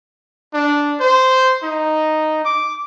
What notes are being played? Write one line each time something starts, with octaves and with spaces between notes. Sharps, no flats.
D4
C5
D#4
D6